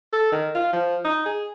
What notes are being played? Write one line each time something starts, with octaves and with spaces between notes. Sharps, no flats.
A4
D#3
F4
F3
D#4
G#4